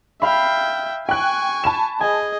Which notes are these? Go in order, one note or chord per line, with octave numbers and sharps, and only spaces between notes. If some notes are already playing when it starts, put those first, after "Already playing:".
E5 F5 G5 B5
G5 G#5 C#6 F#6
A5 B5 E7
G#4 D#5 G#5